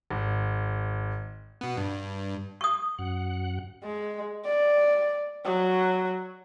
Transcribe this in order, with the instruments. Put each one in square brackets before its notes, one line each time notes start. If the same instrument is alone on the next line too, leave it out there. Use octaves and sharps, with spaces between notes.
[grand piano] G#1
[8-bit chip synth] B2 B3
G2
[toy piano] C#6 D#6
[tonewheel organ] F#2 F#5
[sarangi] G#3
D5
F#3